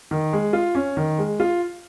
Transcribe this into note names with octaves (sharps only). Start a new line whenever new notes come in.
D#3
G#3
F4
C#4
D#3
G#3
F4